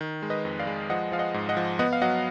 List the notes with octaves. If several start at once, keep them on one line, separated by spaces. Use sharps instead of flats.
D#3
G#3
B4 D#5
F2
D5 F5
G#3
F3 D#5 F#5
F3 F5
D#5 F#5
G#2
D#5 F#5
F3
B3 D#5 F#5
F5
F#3 D#5 F#5